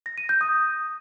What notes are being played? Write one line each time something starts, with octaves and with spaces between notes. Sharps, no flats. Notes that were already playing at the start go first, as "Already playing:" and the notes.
A#6
D#7
G6
D#6